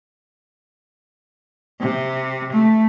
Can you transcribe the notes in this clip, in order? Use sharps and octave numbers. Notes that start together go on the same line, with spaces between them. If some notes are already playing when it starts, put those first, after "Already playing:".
C3
A3